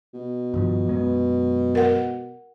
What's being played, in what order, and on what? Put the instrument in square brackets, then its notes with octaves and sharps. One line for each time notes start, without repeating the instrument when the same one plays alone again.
[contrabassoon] B2
[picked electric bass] G2 D#3 F3
F#2 G#3 B3
[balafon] A#4 F#5